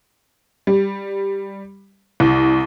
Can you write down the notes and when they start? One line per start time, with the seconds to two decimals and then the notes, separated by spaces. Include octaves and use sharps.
0.67 G3
2.20 C2